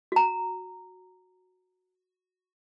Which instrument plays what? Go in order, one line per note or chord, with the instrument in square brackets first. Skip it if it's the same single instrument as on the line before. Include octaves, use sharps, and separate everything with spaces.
[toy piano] F#4 A#5